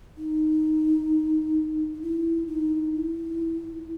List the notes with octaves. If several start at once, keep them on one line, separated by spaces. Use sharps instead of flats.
D#4
D#4
E4
D#4
E4